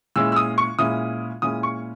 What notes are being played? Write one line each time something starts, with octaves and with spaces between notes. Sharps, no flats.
A#2 G#3 C#4 E4 E6
E6
D#6
C#6
A#2 G#3 C#4 E4 D#6
A#2 G#3 C#4 E4 D#6
C#6